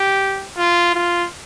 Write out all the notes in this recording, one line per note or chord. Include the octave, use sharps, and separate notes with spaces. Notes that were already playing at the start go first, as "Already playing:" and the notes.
Already playing: G4
F4
F4